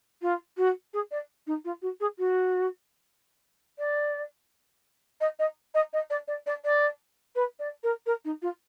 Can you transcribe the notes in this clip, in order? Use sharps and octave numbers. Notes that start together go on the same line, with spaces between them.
F4
F#4
G#4
D5
D#4
F4
F#4
G#4
F#4
D5
D#5
D#5
D#5
D#5
D5
D5
D5
D5
B4
D5
A#4
A#4
D#4
F4